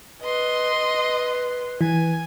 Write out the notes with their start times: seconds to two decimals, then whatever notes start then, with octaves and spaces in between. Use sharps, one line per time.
0.21 B4 D#5 C6
0.75 B4
1.81 E3 G#5